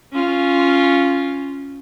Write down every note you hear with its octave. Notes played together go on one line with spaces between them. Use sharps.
C#4 F4